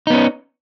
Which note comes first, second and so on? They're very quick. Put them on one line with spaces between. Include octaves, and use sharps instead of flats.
D#4 B3 C#4